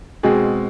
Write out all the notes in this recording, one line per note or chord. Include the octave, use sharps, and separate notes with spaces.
B2 G#3 C4 G#4